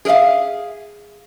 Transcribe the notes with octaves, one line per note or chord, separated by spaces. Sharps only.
G#4 A#4 D5 E5 F5